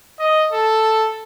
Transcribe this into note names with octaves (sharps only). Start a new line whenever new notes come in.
D#5
A4